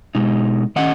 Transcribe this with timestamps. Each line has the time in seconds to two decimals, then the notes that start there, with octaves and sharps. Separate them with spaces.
0.15 B2 G#3 D#4
0.76 D#3 A3 C#4 D#5 F#5